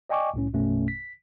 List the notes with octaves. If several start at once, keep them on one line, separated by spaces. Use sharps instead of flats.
D5 D#5 G5 G#5 C#6 D6
C2 A2 C#4
A#1 F#2 B2 A3 C#4
B6